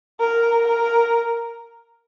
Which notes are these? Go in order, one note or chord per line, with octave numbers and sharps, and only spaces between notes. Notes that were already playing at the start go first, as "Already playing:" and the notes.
A#4
A#4